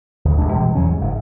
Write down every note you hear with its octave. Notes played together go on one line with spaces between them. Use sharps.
D2 A#2
D#1 F#2 G#3 D4
B2 E3 G3 G#3
E2 E3 F#3 C#4
G#2 C3
F#1 G#2